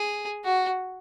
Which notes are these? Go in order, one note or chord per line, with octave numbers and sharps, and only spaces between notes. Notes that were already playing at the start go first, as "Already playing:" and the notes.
Already playing: G#4
F#4